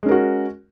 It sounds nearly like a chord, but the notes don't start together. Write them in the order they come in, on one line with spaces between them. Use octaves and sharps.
G#3 C#4 A#4 F#4